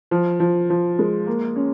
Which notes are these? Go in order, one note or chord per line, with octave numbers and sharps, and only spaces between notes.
F3
F3
F3
G#3
A#3
C#4